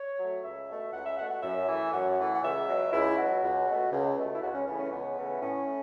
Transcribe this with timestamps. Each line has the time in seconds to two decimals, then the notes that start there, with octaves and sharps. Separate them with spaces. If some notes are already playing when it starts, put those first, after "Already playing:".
Already playing: C#5
0.18 F#3 A3
0.42 C#2 E5
0.68 B2 A3
0.92 C#2 F#5
1.05 E5
1.17 B2 F#5
1.21 A3
1.30 F#5
1.42 F#2 E5
1.67 E3 A3
1.92 F#2 F#5
2.18 E3 A3
2.35 F#5
2.42 C#2 E5
2.68 B2 F#3
2.92 C#2 E4
3.17 B2 F#3 F#4
3.42 C#2
3.67 B2 A3
3.92 C#2
4.16 B2 A3
4.35 E4
4.42 C#2 F#4
4.55 C#4
4.67 C#3 E3 A3 B3
4.79 C#4
4.91 C#2 B3
5.17 C#3 E3 A3
5.41 A2 C#4
5.66 A3